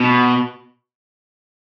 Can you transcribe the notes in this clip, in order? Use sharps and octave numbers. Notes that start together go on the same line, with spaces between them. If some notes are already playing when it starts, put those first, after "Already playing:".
Already playing: B2